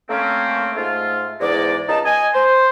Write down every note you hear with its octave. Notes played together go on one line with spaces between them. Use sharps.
A3 A#3 C4 C#4
G#2 A3 F4
E2 G#2 G#3 D5
C#2 D#4 A5
D#5 G#5
C5